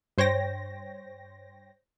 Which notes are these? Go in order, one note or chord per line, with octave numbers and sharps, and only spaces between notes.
G2 C5 C#5 G5 A#6